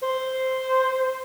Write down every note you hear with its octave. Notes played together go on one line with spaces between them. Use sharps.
C5